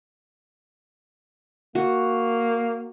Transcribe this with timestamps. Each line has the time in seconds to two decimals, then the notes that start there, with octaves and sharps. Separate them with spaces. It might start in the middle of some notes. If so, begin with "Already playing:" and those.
1.75 A#3 F#4